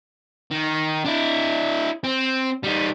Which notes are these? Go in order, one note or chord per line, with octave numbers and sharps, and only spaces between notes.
D#3
D4 E4
C4
G3 D#4